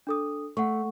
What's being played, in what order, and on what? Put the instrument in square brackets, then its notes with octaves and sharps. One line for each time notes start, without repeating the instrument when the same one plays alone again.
[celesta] D4 A4 D#6
[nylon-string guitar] A3 [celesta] F#5 C#6